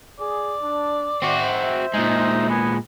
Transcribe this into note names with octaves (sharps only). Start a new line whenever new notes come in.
G#4 D5
D4
C4 F#4 C5 E5
A#2 G#3 D#4
B3 G#4 G#5